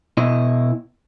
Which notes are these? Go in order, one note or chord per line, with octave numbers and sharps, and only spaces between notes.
B2 E4 D#5